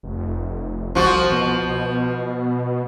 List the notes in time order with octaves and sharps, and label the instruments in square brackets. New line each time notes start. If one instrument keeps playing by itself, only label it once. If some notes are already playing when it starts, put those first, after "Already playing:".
[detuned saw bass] F1
[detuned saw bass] C2 [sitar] F3 F#4
[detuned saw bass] B2